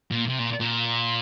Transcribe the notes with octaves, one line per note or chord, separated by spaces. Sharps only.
A#2
C3
A#2
A#2